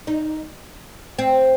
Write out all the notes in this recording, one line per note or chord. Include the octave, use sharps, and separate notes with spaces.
D#4
C4